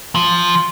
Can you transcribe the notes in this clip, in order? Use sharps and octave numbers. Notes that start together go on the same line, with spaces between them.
F3